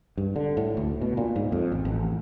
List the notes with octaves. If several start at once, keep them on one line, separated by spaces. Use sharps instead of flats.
G2
D3
A2
D2
B2
A#2
G#2
F2
A1
A1